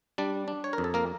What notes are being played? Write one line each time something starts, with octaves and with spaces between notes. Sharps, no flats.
G3 D4 D5
D4
C#5
A#4
F2
A4
A#3 A#4